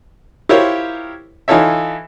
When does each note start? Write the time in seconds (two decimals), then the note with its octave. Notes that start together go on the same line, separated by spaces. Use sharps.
0.49 E4 F4 G4 A#4 C5 C#5
1.48 E3 D#4 F4 A4 C#5 E5